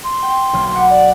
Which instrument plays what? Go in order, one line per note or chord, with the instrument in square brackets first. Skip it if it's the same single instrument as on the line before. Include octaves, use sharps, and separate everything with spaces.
[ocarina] C6
[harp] G5
B1 A#3
F#5 B5 D6
[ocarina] D5